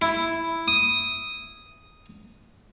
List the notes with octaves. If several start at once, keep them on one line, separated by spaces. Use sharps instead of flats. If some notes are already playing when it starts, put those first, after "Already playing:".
E4
D#6